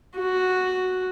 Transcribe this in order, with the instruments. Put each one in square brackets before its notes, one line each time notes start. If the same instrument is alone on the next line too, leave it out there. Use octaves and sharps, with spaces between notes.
[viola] F#4